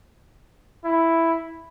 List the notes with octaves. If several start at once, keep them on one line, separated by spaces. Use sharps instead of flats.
E4